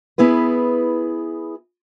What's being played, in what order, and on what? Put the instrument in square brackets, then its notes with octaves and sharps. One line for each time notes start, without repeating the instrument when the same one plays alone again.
[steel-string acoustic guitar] B3 E4 G#4 B4